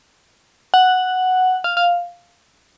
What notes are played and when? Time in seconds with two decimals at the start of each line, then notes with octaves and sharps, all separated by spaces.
0.74 F#5
1.64 F5
1.77 F5